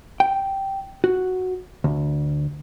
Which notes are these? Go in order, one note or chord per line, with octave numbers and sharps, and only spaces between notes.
G5
F#4
D2